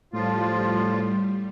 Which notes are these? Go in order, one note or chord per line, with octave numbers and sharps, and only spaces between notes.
A2 F3 G3 F4